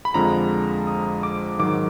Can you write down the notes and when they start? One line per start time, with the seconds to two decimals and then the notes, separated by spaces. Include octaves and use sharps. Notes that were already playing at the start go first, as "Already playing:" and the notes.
0.05 B5
0.14 F2 D3 F3 G#3 A#5
0.87 D#6
1.23 D6
1.59 G#2 D#3 F#3 D6